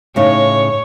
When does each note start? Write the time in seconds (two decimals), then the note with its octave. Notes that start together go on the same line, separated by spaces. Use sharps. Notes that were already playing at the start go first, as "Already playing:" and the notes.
0.16 A2 C#3 D#4 C#5